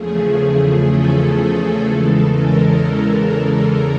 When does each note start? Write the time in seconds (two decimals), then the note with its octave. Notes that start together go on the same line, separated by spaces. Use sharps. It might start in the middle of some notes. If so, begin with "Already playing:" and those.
Already playing: E2 C#3 F3 A3 G#4
0.40 G#4
0.88 A4
1.83 E2 C#3 E3 G#3 A4
2.32 A#4